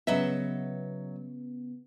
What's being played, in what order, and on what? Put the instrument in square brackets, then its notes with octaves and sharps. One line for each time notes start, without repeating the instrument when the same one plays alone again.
[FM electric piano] C#3 B3 [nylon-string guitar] F#3 D#5 E5